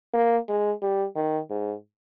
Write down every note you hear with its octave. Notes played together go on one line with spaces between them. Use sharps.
A#3
G#3
G3
D#3
G#2